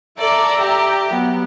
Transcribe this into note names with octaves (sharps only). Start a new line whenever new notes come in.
A4 D5 E5 A#5
G4
F#3 B3